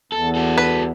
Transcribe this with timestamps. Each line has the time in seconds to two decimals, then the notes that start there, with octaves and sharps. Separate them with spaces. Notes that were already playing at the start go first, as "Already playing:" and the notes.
0.12 E2 A4
0.35 F#4 A4
0.58 B4